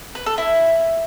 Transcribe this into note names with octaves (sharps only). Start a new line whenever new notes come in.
B4
A4
E4